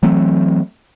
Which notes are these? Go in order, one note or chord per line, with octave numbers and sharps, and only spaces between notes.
E3 F#3 A3 C4